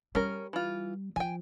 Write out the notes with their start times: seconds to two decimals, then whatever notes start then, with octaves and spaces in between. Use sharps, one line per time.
0.15 G3 C#4 A#4
0.53 E3 F4
1.16 F3 G5 G#5